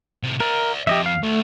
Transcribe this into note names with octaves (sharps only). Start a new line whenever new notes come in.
A2 C3
A#4 D5 E5
F2 G4 D#5 E5
F5
D2 A3